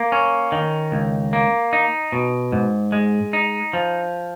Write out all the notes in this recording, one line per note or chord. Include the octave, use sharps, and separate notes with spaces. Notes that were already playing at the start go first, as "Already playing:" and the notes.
Already playing: A#3
C#4
D#3
C#2
A#3
D#4
B2
G#2
G#3
D#4
F3